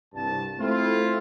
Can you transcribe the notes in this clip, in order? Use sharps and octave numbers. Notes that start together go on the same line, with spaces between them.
C2 G2 A5
A3 C4 E4 F4